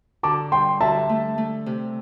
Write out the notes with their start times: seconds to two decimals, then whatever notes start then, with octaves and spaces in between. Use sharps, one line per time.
0.23 D3 A5 D6
0.52 G2 G5 C6
0.81 D3 E5 A5
1.09 A3
1.38 A3
1.66 C3